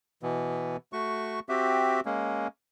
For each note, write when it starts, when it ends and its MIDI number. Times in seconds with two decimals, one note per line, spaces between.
0.23 0.77 47
0.23 0.77 52
0.23 0.77 59
0.93 1.40 57
0.93 1.40 66
0.93 1.40 85
1.49 2.00 60
1.49 2.00 66
1.49 2.00 67
1.49 2.00 76
2.06 2.47 56
2.06 2.47 58
2.06 2.47 61